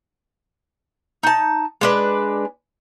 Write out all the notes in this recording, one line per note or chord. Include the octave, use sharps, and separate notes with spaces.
D#4 A5
G#3 D4 B4